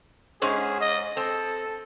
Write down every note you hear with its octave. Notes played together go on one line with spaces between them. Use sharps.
G#2 C#4 G#4 C5
D#5
C4 A4